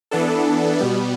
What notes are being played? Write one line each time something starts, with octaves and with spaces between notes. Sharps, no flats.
E3 B3 D4 A4
B2 G3 B3